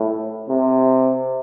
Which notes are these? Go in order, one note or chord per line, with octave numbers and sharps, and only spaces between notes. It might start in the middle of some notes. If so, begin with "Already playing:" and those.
Already playing: A2
C3